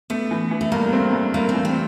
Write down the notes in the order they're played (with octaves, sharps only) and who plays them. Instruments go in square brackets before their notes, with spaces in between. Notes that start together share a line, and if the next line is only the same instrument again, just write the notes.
[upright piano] A3 [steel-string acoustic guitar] B3
[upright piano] E3
E3
[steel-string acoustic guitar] A3
[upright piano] G2 [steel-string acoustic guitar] A#3
[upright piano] C4
G2
[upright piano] A3 [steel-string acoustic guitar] A#3
[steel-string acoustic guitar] C4
[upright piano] E3
[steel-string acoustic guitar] C4